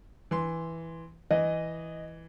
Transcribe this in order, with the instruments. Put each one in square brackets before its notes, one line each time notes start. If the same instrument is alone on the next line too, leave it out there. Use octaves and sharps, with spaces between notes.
[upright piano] E3 C6
[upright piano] E3 [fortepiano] D#5